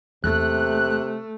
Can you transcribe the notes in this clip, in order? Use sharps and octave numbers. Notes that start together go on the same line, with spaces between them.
E2 C3 A3 A#3 F#6